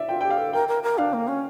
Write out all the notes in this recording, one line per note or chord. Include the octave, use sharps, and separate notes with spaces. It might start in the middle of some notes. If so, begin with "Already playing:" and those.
Already playing: D5 E5
F4 G5
G4 G5
F5
A4
A#4 G5
A#4
A#4
D4 F5
A#3
C#4